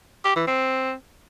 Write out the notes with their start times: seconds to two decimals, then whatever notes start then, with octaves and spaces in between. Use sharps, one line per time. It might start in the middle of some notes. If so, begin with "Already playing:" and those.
0.25 G4
0.36 E3
0.47 C4